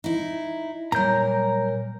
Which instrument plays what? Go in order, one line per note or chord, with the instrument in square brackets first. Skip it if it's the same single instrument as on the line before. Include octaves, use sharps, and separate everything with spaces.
[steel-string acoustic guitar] D#4 E4
[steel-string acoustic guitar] A#2 A#4 [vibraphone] F#3 G3 C#5 [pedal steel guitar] A#5 G6